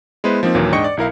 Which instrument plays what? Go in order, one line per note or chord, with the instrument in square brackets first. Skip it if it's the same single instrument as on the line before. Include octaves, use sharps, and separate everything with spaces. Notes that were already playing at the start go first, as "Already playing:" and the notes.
[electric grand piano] G#3 B3 E4 B4 C5
F3 A#3 C4 D#4
D#2 A#2 E3 F#3 A#3
G#2 D4 D#5 G5 C#6 C#7
D5
B1 E4 A#4 F5